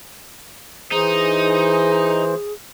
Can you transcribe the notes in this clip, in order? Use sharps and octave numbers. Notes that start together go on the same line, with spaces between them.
E3 D#4 G#4 C5